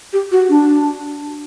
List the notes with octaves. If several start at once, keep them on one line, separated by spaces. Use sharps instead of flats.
G4
F#4
D4